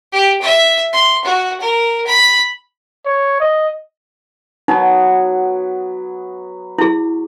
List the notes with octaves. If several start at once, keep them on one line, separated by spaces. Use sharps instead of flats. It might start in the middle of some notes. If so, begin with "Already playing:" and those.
G4
E5
C6
F#4
A#4
B5
C#5
D#5
F#3 B3 D#4
E4 G#4